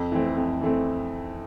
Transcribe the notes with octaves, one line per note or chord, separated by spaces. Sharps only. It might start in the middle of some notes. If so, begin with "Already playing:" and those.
Already playing: F2
E3 A3 C4
F2
E3 A3 C4